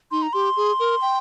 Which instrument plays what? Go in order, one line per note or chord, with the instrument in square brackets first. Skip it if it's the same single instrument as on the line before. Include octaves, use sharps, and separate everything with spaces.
[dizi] D#4 [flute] C6
[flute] A#5
[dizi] G4 [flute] C6
[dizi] G#4
A#4
G5